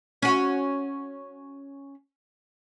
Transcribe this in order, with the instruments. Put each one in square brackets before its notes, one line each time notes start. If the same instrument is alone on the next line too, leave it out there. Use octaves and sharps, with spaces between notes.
[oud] C#4 F#4